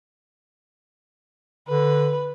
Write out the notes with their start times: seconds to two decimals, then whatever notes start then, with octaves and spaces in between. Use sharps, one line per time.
1.69 D3 B4